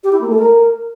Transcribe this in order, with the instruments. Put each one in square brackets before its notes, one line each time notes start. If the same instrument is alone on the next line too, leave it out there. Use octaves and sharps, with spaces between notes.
[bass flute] G4
E4
A#3
A3
A#4